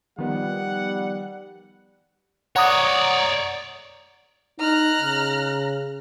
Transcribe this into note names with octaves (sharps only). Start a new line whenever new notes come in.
D#3 F3 G3 B3 F#5
C#5 D5 F#5 A#5 D#6
D#4 A#5 F6 F#6
C#3